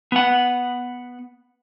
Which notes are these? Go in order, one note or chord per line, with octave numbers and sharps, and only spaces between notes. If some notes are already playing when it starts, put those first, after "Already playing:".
B3 F#5